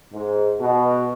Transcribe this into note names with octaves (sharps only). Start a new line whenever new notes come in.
G#2
B2